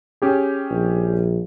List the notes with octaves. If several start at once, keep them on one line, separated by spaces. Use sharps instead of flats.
C#4 G4 G#4
A#1